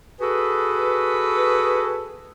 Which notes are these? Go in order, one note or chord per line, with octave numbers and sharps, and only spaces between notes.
F#4 G#4 A4 B4